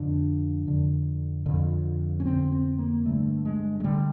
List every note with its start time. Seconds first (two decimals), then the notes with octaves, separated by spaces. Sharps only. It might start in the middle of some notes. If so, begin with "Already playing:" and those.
Already playing: F2 D3 D4
0.67 F2 D3
1.46 F2 D3
2.20 C#4
2.25 F2 D3 C4
2.52 C4
2.78 A#3
3.05 G2 D3 A3
3.45 G#3
3.80 G#3
3.84 D3 G3